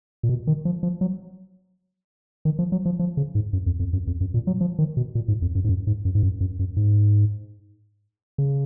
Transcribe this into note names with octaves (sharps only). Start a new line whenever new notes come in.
A#2
B2
D#3
F3
F3
F#3
D#3
F3
F#3
F3
F3
C#3
G#2
F#2
F2
F2
F#2
F2
F#2
A#2
F#3
F3
D#3
B2
A#2
G#2
F2
F#2
G#2
F#2
G#2
F#2
G#2
F#2
F#2
F#2
G#2
C#3